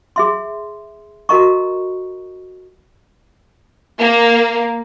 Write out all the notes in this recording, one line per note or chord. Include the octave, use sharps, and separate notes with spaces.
G#4 E5 C6
F#4 A4 A#4 D#5 A#5 C#6
A#3